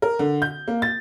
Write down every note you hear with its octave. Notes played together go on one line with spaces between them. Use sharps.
A#4
D3
G6
A#3
A6